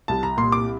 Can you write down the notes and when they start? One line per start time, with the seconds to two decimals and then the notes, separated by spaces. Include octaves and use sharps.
0.08 C2 A5
0.23 A#5
0.37 A#2 C6
0.52 D6